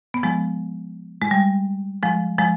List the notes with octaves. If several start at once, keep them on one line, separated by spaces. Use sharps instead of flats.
B3
F3 G#3
G#3
G3
F3 G#3
F3 G#3